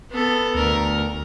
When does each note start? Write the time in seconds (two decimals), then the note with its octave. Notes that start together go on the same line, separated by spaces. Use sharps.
0.11 B3 A4
0.55 D2 A#4